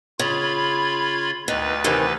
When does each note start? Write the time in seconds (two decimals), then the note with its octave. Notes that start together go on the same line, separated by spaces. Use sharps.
0.19 C#3 F4 B5 G#6
1.48 D2 D#3 B4 A6
1.84 C3 D#3 E3